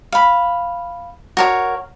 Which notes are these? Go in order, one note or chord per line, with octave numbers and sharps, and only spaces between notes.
F5 B5
F#4 A#4 C#5